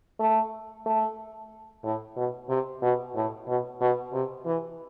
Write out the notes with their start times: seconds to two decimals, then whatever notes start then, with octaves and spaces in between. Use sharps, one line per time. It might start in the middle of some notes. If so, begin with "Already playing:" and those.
0.20 A3
0.86 A3
1.84 A2
2.16 B2
2.49 C3
2.82 B2
3.15 A2
3.48 B2
3.81 B2
4.13 C3
4.46 E3